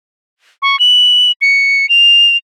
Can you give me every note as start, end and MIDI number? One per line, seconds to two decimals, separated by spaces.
0.62 0.79 85
0.79 1.32 102
1.41 1.89 97
1.89 2.37 101